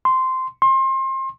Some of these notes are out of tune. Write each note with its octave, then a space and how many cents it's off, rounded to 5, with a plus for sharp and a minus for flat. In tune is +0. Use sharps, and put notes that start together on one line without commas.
C6 -10
C6 +30